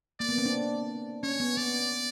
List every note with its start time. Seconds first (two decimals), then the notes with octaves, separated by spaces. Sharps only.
0.20 A#3 D5
0.29 B3
0.38 C4
0.45 D4
1.23 C#4 C#5
1.40 B3
1.57 B3 D5